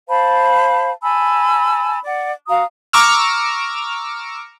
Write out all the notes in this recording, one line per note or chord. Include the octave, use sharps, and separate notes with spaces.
C5 F5 A5 B5
G#5 A5 B5 E6
D5 F#5
F#4 F5 A#5 D#6
A#5 C#6 D6 E6 F6